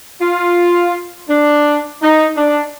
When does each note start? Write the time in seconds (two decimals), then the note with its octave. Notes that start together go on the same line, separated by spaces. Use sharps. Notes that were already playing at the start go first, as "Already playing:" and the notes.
0.22 F4
1.30 D4
2.02 D#4
2.37 D4